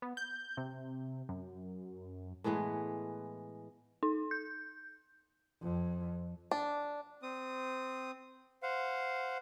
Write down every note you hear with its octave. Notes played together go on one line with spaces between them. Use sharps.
B3
G6
C3
F#2
A2 E3 G#3 B3
D#4
G6
F2
D4
C4 D#6
C5 F5 F#5